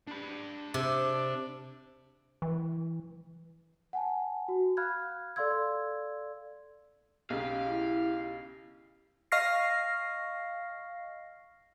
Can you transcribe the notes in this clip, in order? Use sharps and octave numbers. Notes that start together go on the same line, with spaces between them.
D4 B5
C3
E3
F#5 G#5 A5
F#4
F5 B5 F6 F#6 G#6
A4 D5 F5 C6 E6 G#6
B1 C#3 G4 F5
E4
D#5 F5 C#6 F6 A#6 C7